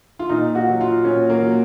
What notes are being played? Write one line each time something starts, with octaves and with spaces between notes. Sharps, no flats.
F4
A#2 D#4
F#4
F#3
F4
A#2 C#4
A#3
F#3